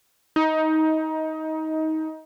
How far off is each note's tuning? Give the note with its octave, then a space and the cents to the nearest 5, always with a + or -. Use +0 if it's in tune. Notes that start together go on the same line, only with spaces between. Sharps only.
D#4 +20